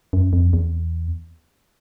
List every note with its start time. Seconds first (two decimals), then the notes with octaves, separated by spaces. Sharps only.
0.13 F#2
0.33 F2
0.53 E2